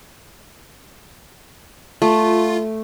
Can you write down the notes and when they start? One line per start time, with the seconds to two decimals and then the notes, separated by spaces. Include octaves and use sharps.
2.02 A3 F4